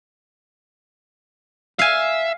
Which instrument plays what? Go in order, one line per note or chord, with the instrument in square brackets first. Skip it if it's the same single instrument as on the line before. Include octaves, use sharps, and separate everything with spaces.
[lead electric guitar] E5 [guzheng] F5 G#5